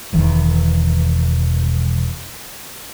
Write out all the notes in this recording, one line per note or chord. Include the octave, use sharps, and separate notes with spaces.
E1 E2 D#3